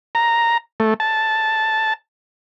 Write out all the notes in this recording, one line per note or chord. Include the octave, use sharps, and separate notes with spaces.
A#5
A3
A5